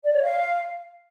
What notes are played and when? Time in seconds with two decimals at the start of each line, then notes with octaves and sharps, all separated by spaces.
0.04 D5
0.13 C#5
0.23 F5